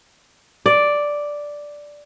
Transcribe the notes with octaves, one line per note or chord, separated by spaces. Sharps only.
D5